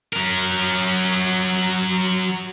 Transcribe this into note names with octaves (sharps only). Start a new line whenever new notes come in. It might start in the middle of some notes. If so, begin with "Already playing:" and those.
F#3 A#4